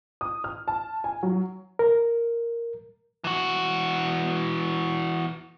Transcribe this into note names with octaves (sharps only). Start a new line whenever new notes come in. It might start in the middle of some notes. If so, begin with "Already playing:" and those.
D#6
F6
A5
G#5
F#3
A#4
E3 F#4